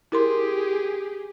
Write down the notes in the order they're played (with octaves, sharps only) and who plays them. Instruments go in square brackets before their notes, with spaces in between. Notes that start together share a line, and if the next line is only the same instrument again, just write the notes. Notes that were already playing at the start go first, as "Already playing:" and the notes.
[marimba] E4 A#4 C6 [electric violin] G4 G#4